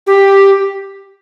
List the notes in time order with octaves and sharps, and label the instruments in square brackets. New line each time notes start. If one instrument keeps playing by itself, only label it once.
[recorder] G4